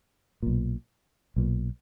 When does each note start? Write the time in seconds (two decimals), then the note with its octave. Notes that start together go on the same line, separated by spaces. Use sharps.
0.43 B1 A#2
1.36 B1 A#2